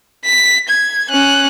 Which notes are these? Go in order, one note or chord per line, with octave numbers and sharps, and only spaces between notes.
B6
G#6
C#4 F#6